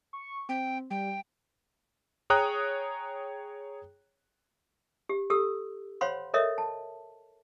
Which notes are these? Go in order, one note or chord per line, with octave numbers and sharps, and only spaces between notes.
C#6
C4 G5
G3 G5
G#4 C#5 G5 A#5 D#6 F#6
G4
G4 A4 E6
C5 C#5 F5 F#5 B5 C6
A4 A#4 C#5 D#5 E5
A5